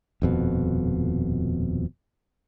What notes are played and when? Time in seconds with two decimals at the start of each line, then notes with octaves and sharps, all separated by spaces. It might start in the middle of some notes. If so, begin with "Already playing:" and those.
0.22 D#1 F2 B2